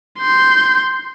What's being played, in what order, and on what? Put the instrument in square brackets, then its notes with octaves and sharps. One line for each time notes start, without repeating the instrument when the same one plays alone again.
[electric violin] C6 G6